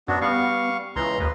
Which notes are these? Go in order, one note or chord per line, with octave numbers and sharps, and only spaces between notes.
F#2 B3 D4 F#4
G3 B3 F5 C#6
C#2 E3 A#5 C6
D#2 B4